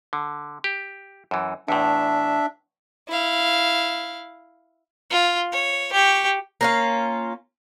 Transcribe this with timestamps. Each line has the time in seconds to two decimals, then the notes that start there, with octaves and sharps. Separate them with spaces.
0.13 D3
0.64 G4
1.31 F#2 E3
1.68 E2 A2 D4 E5
3.09 E4 F5
5.10 F4
5.52 C#5
5.93 G4 C#6
6.61 A#3 C#4 F4